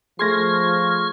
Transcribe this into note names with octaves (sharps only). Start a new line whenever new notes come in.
F3 A3 G#4 C6 C#6 F6 G#6 A#6